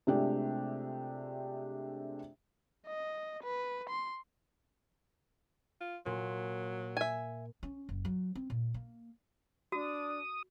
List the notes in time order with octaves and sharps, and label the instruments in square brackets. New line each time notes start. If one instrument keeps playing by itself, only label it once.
[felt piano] C3 G#3 A3 D4 F4 G4
[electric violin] D#5
B4
C6
[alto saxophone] F4
[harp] A#2 [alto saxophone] F#3
[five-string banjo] E5 G#5
[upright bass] C#4
F#1
F#3
C4
A#2
A#3
[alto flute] D4 [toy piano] F#4 [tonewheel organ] D#6